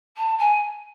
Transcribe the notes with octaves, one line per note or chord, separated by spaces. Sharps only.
A5
G#5